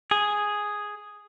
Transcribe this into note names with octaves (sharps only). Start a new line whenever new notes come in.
G#4